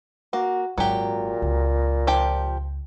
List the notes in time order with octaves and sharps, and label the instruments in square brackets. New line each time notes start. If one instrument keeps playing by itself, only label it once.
[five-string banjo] A#3 [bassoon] F#4
[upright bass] G#1 [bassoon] A#2 [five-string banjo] F#3 G4
[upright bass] C#2
[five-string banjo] F3 G4 G5